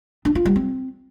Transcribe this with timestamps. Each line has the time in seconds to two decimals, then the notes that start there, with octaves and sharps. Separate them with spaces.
0.25 D4
0.35 F4
0.46 G3
0.56 C4